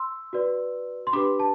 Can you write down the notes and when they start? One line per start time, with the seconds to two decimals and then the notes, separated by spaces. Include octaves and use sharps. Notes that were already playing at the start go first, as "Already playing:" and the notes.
Already playing: C6 E6
0.33 F#4 B4 D5
1.07 C6
1.13 D4 G4 B4 B5 D6
1.39 A5